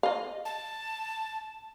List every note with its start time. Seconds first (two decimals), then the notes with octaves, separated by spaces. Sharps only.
0.03 D#5 F5
0.45 A5